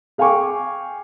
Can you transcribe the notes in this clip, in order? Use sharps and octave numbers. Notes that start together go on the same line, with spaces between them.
G#4 F5 G5 G#5 C#6 D6